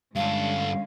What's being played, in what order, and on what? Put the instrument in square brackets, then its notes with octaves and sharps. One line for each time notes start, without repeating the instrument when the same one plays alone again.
[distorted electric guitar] G2 A4 [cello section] D3 G#3 C#4 [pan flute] F5